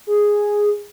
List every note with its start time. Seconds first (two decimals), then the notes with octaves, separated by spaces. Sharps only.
0.07 G#4